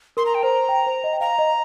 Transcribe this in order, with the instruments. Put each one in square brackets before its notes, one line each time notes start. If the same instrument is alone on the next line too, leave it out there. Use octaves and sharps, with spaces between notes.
[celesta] A#4 [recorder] C6
[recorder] A#5
G5
[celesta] C5 [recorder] A#5
[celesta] G5
C5
D#5
G5
[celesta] F5 [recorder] A#5
[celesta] D#5